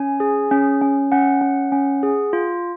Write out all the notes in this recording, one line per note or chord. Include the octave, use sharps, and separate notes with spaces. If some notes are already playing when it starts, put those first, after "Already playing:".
Already playing: C#4 G#5
G#4
C#4
C#4
C#4 F#5
C#4
C#4
G#4
F4